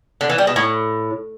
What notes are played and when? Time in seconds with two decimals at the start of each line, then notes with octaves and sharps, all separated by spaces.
0.21 D3
0.30 E3
0.38 G3
0.47 B2
0.56 A2